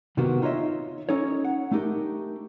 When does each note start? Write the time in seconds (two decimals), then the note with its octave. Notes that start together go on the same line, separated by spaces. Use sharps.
0.17 C3 D#3 A#3 B3 F#4 G4
0.42 D#4 F4 C#5 D#5 E5
1.09 C#4 D#4 A4 C#5
1.45 F#5
1.71 A3 D4 D#4 G4 A#4